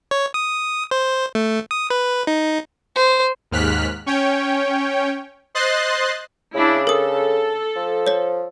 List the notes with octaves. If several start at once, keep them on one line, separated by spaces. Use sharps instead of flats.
C#5
D#6
C5
A3
D#6
B4
D#4
C5
D#2 G#2 F6 F#6 B6
C#4 C#5 G5
C5 D#5 C6 F#6 A6 C7
C#3 D4 E4
A4 A#4 D#6
F3
C5 C#5